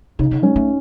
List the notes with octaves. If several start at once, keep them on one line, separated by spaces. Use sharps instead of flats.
C#3 D#4
C#3
G#3 C#4
A3